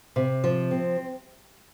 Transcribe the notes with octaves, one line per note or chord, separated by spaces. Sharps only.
C3
F3
C4